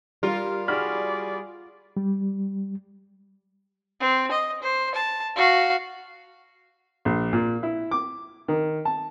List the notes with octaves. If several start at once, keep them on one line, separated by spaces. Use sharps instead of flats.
G3 F4 A#4
G3 F#4 G#4 D5 B5 F6
G3
C4
D#5
C5
A5
F#4 F5
A#1
A#2
E4
D6
D#3
A5